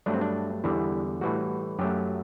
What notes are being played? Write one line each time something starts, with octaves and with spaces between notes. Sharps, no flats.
G2 F#3 A3 D4
C4
D4
E2 D3 G3 E4
A2 E3 G3 F#4
F#2 F#3 A3 G4